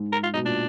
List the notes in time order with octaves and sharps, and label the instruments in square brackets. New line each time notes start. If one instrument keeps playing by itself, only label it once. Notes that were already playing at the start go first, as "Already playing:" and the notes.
Already playing: [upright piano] G#2
[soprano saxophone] A#4
F4
[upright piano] B2 [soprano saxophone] D#4
[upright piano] A#2 [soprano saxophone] D4